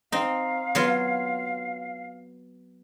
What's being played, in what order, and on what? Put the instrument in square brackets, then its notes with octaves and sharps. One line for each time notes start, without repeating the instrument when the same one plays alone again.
[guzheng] C4 D#4 [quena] F5
[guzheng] F#3 B3 F4